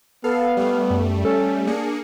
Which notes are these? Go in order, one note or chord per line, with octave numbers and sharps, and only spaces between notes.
B3 A4 F5
G3 A3
F#2
C#4 A4
A#3 D4 G#4 C#7